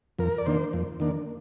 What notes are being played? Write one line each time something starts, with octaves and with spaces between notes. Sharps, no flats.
F2 A#4
D5
D#3 A#3 D4 C5
F2
D#3 A#3 D4